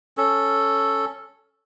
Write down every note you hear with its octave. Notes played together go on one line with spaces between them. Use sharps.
C#4 A4